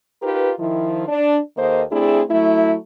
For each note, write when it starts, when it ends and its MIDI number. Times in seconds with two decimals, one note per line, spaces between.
0.22 0.52 63
0.22 0.52 65
0.22 0.52 67
0.22 0.52 70
0.22 0.52 71
0.58 1.04 51
0.58 1.04 53
0.58 1.04 64
1.07 1.38 62
1.57 1.82 39
1.57 1.82 51
1.57 1.82 58
1.57 1.82 69
1.57 1.82 72
1.57 1.82 75
1.92 2.22 57
1.92 2.22 60
1.92 2.22 62
1.92 2.22 64
1.92 2.22 68
2.30 2.76 54
2.30 2.76 57
2.30 2.76 64